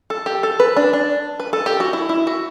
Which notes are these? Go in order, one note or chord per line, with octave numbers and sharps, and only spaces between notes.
A4
G4
A4
B4
D4
D4
B4
A4
G4
F#4
E4
E4
F#4